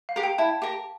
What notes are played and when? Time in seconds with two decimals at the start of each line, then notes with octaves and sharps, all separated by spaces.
0.09 F5
0.16 G4 A#4
0.23 G5
0.38 E4 A5
0.62 G4 A#4